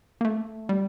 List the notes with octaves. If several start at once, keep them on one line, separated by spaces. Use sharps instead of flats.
A#3
A3
G3